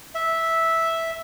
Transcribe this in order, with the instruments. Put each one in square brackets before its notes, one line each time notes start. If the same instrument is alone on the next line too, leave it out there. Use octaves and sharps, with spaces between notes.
[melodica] E5